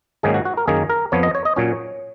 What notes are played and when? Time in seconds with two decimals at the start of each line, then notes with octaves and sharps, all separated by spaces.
0.23 G#2 D#3 F#3 A#3 C#4 G#4
0.34 F#4
0.45 F#4
0.57 A#4
0.67 F#2 D#3 A#3 C#4 G#4
0.90 A#4
1.12 F2 F3 B3 C#5
1.23 D#5
1.35 C#5
1.45 D#5
1.56 A#2 F#3 C#4 C#5